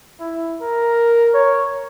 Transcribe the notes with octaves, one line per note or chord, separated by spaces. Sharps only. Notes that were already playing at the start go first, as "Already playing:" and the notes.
E4
A#4
C#5